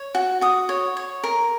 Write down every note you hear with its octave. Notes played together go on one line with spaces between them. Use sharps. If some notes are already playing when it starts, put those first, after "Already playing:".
Already playing: C#5
F#4
F#4 D#6
C#5
C#5
A#4